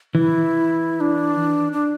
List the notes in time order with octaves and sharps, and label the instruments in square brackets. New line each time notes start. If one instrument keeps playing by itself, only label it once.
[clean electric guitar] E3 [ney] E4
[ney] D4
D4